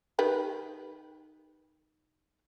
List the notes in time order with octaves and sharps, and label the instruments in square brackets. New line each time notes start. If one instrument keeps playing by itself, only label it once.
[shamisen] D#3 G4 B4